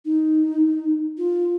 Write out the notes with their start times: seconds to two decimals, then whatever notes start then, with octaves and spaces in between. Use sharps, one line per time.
0.05 D#4
1.18 F4